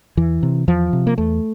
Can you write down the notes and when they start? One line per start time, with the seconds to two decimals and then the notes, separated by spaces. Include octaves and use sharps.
0.17 E2 E3
0.43 C3
0.68 E2 F3
0.93 C3
1.07 A#3
1.18 E2 A3